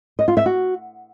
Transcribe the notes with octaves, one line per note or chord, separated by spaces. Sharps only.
D#5
F4
E5
F#4